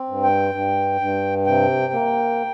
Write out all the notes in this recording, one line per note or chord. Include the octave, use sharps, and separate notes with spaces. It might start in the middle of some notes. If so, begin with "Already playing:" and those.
Already playing: C4
G2
G5
G2
G2
C3 G5
A#3